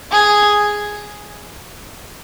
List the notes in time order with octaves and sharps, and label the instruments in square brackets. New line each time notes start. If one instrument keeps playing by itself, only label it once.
[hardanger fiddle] G#4